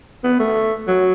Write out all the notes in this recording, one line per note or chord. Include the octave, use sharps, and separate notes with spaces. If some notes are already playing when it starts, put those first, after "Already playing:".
B3
A3
F#3